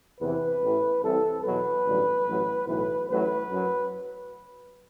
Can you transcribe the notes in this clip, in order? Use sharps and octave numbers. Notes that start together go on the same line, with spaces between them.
E2 C3 E3 B4
A1 A2 E3
C2 C3 E3 A4
E2 B2 F#3 B4
A1 G2 D3 F#3
A1 A2 F#3
B1 A2 E3 B4
A1 A2 F#3 B4
F#2
F#3